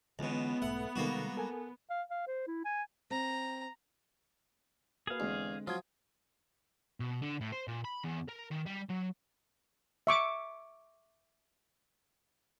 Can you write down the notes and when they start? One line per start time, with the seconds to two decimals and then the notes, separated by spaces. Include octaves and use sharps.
0.19 C#2 B2 D3 E3 G#3 B3
0.62 B1 G#2 A3 A4 E5 F#5
0.96 C3 D#3 G3 G#3 A#3 F#4 A4
1.37 A4 A#4 G#5
1.90 F5
2.10 F5
2.28 C5
2.48 E4
2.65 G#5
3.11 C4 A#5
5.07 A#3 F#4 G#4 B4 F5
5.20 E2 D3 G#3 C4
5.67 F3 F#3 F4 D#6 G#6
7.00 B2
7.22 D3
7.41 A2
7.52 C5
7.68 A#2
7.85 B5
8.05 E2
8.29 A#4
8.51 D#3
8.66 G3
8.89 F#3
10.07 E5 C#6 D6